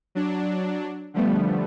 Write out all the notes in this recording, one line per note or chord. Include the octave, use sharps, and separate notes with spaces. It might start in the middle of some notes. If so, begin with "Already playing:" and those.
F#3 D4
D3 F3 G3 A3 B3